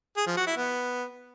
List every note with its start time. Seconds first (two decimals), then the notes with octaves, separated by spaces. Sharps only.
0.17 G#4
0.27 F3
0.37 F#4
0.47 E4
0.57 B3